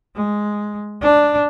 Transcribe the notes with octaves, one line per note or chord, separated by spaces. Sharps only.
G#3
D4